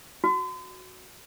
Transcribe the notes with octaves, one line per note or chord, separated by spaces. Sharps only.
F#4